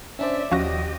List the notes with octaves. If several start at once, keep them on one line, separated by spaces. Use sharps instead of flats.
C#4 D4 C5 D5 E5
D#2 F3 C#4 F#4 G4 D#5 A#6